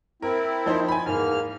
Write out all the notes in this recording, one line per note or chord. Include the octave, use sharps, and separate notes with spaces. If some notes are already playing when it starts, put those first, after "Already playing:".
C4 E4 A#4
F3 D#4 C5
G#5 B5
E2 G#2 A#3 F6